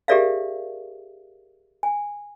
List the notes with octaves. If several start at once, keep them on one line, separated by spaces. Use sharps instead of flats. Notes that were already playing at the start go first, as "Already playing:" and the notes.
G4 G#4 A#4 D5 E5 F5
G#5